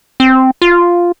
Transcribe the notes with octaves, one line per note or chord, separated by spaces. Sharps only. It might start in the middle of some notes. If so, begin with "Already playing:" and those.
C4
F4